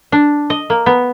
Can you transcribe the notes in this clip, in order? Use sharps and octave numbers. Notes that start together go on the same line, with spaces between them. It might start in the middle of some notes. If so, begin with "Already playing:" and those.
D4
D#5
A#3
B3